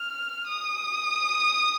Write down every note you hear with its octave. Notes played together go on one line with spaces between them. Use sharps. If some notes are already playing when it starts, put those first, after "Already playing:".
Already playing: F6
D#6